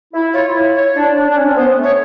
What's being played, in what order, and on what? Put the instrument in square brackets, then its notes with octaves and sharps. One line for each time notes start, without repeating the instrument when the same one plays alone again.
[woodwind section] E4
[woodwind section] F4 [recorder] C#5
[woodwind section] E4
[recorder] C#5
[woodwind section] D4
D4
D4
C#4
C4
[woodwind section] B3 [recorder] C5
[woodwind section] A3
[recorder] C#5